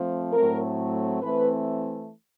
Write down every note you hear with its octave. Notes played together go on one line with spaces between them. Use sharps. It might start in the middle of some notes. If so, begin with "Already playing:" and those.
Already playing: F3 A3 C4
A2 F#3 A3 C4 A#4
E3 A3 C4 B4